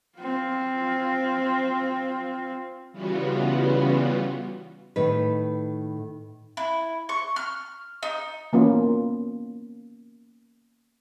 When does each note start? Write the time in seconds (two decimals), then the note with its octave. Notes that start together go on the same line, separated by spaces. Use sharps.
0.19 C4 F4
2.92 C#3 E3 G3 B3 F4 F#4
4.96 A2 D#3 B4
6.57 E4
7.09 C#6
7.36 F6
8.03 D#4
8.53 E3 A#3 B3 C#4 F4